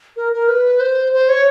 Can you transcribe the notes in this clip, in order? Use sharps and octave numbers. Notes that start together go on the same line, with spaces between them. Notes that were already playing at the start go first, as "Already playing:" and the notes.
A#4
A#4
B4
C5
C5
C#5